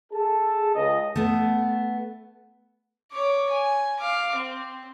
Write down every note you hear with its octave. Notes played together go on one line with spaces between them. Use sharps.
G#4 A4 A5
C#2 D#5
A3 B3
C#5 D6
G#5
F5 D6
C4